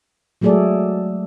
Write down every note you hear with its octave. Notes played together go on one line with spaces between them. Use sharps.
F#3 G#3 A3 G#4 A4 D5